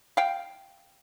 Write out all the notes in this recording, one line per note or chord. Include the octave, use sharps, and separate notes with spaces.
F5 G5